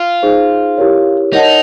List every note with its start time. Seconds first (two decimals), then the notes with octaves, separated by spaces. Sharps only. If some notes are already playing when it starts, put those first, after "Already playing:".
Already playing: F4
0.23 D#4 G#4 C5
0.78 E4 G4 A#4 C#5
1.33 D#4 A#4 C#5 F#5 A5